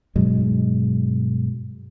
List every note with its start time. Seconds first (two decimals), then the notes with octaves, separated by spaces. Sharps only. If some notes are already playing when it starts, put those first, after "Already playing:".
0.16 G2 B2 F#3 G#3